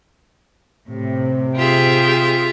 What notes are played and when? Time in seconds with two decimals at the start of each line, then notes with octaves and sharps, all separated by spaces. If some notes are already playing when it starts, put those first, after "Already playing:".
0.89 A2 C3
1.56 F4 G4 G#4 E5